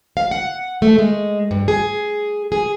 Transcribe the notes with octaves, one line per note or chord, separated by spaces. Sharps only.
F5
F#5
A3
G#3
G2
G#4
G#4